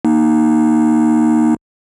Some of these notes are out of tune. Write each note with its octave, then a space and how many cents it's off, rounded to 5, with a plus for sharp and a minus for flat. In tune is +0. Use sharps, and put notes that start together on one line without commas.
A#3 +10 D#4 -5